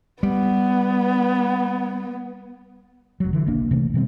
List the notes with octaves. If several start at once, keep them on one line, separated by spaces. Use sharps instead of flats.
G3 B3
F1 F#3
D3 E3
F#1 B1 A#3 D4
C3 E3 A3
B2 D#3 G3 C4